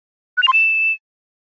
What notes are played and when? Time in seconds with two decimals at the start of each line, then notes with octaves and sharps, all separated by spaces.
0.37 F#6
0.43 F7
0.48 C6
0.53 E7